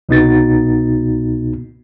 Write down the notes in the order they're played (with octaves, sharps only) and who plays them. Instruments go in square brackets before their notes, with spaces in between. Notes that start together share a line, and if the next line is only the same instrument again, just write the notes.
[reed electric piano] C2 B2 B3 D#4 F#4 A6